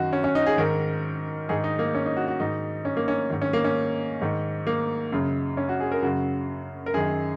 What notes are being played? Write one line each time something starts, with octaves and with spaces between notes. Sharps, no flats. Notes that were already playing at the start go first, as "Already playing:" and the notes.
Already playing: F#2 D#3 F#4
C#4
C#4
D#4
G#4
G#2 D#3 A#4
G#2 D#3 G#4
D#4
A#3
C#4
D#4
F#4
F#4
G#2 D#3 D#4
C#4
A#3
C#4
G#2 D#3
C#4
A#3
C#4
G#2 D#3
A#3
F#2 C#3
C#4
F#4
G#4
A#4
F#2 C#3 F#4
A#4
F#2 D#3 G#4